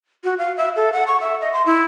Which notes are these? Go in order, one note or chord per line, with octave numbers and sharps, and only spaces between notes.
F#4
F5
E5
A4
F#5
C#6
E5
D#5
C6
E4